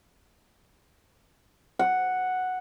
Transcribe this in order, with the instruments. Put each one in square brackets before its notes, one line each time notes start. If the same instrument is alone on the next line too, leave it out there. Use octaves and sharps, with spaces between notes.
[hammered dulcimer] F#5